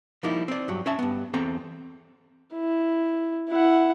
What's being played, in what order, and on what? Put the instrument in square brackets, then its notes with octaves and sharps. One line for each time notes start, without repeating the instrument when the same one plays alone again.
[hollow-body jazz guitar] F3 G3 A#3 D#4 E4
C4 D5
G2 F#3
C#4 E5 A5
G2 B3
E2 C4 A4 A#5
[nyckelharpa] E4
E4 F#5